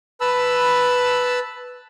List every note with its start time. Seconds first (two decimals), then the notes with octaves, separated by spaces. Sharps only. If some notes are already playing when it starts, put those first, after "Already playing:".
0.21 B4 A5 B5 E6